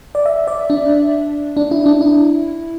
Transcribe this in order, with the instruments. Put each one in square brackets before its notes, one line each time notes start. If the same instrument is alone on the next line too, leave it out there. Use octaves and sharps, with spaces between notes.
[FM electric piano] D5
E5
D5
D4
D4
E4
D4
E4